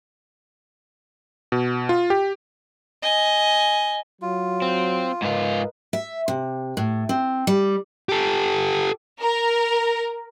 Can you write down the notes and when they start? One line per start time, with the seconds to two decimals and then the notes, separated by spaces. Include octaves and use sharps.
1.52 B2
1.89 F4
2.10 G4
3.02 D#5 G#5
4.22 F#3 F4
4.62 C4
5.22 G#2 F4 A#4 B4 D#5
5.93 E5
6.28 C3
6.77 A2
7.09 C4
7.47 G3
8.09 G4 A4
9.21 A#4